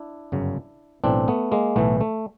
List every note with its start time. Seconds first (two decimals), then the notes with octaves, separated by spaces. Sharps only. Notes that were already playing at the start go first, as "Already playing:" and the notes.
Already playing: D4 E4
0.32 G1 F#2 C#3 F#3
1.04 B1 A2 E3 C4 D4
1.28 A3 B3
1.52 G#3 A#3
1.76 B1 A2 E3 A3 B3
2.01 A3